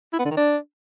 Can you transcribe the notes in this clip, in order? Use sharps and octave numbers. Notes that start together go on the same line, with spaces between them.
E4
B3
D3
D#3
D4